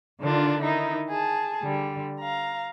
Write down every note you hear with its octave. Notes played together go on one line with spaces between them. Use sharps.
D3 D#3 D4 F4
D#3 D#4 E4
G#4 A5
D3 G3
F5 A#5